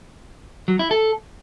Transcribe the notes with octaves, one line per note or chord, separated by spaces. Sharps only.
F#3
E4
A4